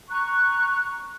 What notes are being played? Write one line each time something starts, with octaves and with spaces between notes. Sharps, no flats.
A#5 C#6 F#6